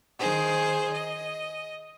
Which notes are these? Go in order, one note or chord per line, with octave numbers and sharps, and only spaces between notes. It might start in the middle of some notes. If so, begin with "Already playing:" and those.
D#3 G#4 C5
D#5